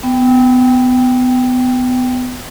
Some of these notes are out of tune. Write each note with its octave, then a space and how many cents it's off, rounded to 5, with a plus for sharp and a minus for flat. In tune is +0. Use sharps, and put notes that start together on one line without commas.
B3 +25 G5 +0